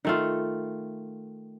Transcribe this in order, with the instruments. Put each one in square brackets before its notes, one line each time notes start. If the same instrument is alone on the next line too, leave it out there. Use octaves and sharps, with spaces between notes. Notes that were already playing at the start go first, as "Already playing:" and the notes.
[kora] D#3 A3 F4